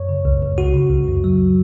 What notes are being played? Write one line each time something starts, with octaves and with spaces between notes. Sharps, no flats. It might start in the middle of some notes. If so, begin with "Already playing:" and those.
Already playing: F#2 C#5
C#3
C#2
C#2
C#3 F#4
C#3
C#2
F#2
F#3